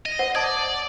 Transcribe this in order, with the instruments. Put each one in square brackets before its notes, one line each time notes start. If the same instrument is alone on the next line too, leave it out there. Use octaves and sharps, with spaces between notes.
[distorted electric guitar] D#5
[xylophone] C5 F#5
[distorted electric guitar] D5 [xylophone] A5 D#6 G#6